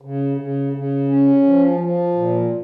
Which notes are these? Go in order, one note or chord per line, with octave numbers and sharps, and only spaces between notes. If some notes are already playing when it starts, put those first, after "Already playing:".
C#3
C#3
C#3
C#4
F3
F3
A#2